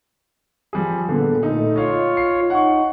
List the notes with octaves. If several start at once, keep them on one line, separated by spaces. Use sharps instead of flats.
F3 G3 G#4
A#2 D3 B3 A4
A3 D#4
F4 C#5 D#5 F5
C7
D#4 F#5 C#6